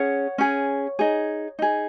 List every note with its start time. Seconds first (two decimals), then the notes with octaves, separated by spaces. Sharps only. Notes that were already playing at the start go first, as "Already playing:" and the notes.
Already playing: C#4 G#4 C#5 F#5
0.38 C#4 G#4
0.99 D#4 G#4
1.59 D#4 G#4